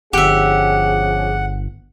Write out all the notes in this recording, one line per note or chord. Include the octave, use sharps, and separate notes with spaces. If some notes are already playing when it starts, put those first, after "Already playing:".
G1 F3 C#4 G4 G#4 E5 F#5